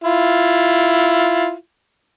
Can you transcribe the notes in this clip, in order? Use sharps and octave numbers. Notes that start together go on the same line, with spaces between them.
E4 F4